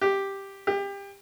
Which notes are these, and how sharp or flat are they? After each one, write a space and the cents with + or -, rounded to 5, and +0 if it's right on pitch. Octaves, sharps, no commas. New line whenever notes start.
G4 +0
G4 +25